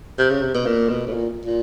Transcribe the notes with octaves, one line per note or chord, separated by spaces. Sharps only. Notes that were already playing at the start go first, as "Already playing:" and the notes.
C3
C#3
C3
B2
A#2
B2
A2
A#2
A#2